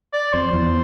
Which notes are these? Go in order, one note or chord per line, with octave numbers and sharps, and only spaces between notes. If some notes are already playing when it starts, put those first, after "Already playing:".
D5
F2 C5
E2